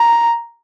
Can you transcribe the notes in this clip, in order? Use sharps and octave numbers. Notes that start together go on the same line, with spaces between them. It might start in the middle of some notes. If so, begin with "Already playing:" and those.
Already playing: A#5